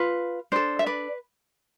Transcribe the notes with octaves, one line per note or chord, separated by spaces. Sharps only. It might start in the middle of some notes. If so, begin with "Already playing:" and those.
Already playing: F4 B4
D4 A4 C5
E5
B4 D5